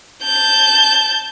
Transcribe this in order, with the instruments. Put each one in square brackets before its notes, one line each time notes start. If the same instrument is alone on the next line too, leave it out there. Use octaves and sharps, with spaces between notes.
[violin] A5 G6